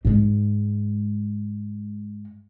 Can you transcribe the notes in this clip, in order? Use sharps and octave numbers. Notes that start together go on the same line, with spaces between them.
G#2 G#3